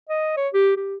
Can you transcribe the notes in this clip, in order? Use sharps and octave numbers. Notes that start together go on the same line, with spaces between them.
D#5
C#5
G4
G4